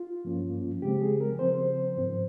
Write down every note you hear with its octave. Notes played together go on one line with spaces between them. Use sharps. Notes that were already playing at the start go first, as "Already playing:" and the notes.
Already playing: F4
G2 F3 A#3 C#4
C#3 F3 G#3 C4 G4
G#4
A#4
C#3 F3 C4 C5
G#2 F3 C4